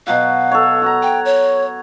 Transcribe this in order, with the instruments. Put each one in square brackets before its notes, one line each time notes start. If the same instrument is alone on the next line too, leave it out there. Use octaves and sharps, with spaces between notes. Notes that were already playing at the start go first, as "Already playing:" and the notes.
[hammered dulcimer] B2 F#3 F#5 [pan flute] F5
[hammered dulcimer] A4 C#5
F#4 F#5 A#5
[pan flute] G5
C#5